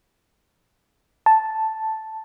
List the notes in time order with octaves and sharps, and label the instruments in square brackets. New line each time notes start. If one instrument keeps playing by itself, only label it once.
[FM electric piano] A5